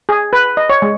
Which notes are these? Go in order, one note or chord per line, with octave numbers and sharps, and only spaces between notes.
G#4
B4
D#5
C#5
G#3